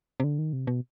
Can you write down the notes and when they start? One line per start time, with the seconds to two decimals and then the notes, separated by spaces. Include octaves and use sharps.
0.20 C3
0.24 D3
0.39 D#3
0.53 C3
0.67 B2